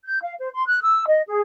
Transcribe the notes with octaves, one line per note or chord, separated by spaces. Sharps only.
G6
F5
C5
C6
F#6
E6
D#5
G#4